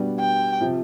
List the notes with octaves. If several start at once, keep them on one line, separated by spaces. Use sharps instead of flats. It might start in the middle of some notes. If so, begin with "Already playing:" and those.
Already playing: B2 G3 B3 D4 F#4
G5
C3 F3